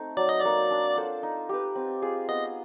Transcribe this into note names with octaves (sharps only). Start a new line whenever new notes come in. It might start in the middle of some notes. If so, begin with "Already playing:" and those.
Already playing: A3 C4 D#4
F#3 D5
D#5
A#3 D#4 F#4 D5
D4
F4 A4 C5
D#4
G4 B4
C4
F4 G#4
B3 D#5